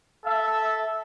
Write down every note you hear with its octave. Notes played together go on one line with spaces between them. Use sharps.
A4 E5